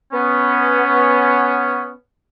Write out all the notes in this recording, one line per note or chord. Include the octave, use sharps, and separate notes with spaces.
B3 C#4